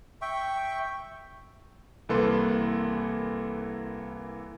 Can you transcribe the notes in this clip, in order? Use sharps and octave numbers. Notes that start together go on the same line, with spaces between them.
E5 G5 C#6
C2 E3 A#3 A4 B4 C6